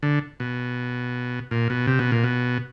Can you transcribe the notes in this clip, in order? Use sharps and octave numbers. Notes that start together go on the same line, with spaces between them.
D3
B2
A#2
B2
C3
B2
A#2
B2